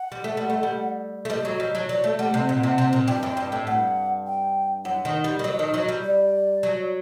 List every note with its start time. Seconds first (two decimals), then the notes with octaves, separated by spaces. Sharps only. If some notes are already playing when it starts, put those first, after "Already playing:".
Already playing: F#5
0.12 G3
0.24 A3
0.37 G3
0.50 A3
0.63 G3
1.25 A3
1.30 G3 D#5
1.45 F#3
1.60 G3
1.75 F#3
1.89 F#3 D5
2.04 A3
2.19 G3 F#5
2.34 C3
2.49 A#2
2.63 C3
2.78 C3
2.93 A#2
3.08 G2 G5
3.23 F#2
3.37 G2
3.52 A2
3.67 G2 F#5
4.26 G5
4.85 F#2 F#5
5.05 D#3
5.24 G3
5.39 D#3
5.44 F#3 D#5
5.59 D#3
5.74 F#3
5.88 G3
6.04 D5
6.63 F#3